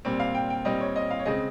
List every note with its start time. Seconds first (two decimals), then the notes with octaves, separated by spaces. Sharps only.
0.05 A#2 G3 C4
0.20 F5
0.35 G5
0.50 G5
0.65 A#2 G3 C4 D#5
0.80 C#5
0.96 D#5
1.11 F5
1.19 C#5
1.26 C#3 G#3 C4 D#5